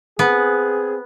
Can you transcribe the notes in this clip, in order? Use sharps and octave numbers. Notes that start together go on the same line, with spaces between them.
B3 C4 G#4